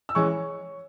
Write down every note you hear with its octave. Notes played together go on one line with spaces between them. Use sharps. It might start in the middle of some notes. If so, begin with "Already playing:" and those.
E6
E3 G#3 C#4 C#5 C#6